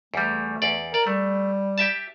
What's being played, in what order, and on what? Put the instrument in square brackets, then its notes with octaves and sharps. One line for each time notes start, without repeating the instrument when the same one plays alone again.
[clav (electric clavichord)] E2 G3 [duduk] A3
[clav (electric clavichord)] E2 D5
[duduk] A#4 [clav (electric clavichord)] D5
[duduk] G3 [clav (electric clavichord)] A3
[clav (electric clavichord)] G4 E5 A5